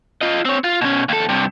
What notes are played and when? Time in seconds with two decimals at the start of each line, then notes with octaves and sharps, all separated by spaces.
0.21 F4 D#5
0.45 C4 C#5
0.64 F4
0.81 B2 C#4
1.09 D#2 A4
1.29 G2 C3